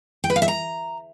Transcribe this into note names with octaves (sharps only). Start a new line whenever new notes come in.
G5
B4
F5
E5
A#5